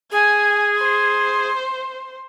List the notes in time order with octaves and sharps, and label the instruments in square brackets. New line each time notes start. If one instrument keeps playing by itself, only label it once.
[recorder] G#4 [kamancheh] G#5
[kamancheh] C5